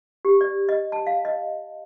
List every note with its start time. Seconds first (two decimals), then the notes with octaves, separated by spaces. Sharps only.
0.25 G4
0.41 D5
0.69 D#5
0.92 A5
1.07 F5
1.25 D#5